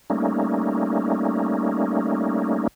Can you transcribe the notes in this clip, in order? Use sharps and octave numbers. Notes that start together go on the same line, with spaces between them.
G3 A3 A#3 C#4 D#4